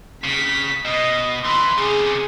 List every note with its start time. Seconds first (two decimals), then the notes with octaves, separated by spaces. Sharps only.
0.24 C#3 B6
0.85 B2 D#5
1.45 E3 B5 C6
1.79 C3 C#4 G#4